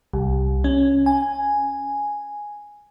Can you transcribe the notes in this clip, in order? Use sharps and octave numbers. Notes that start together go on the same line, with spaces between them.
C2
C#4
G#5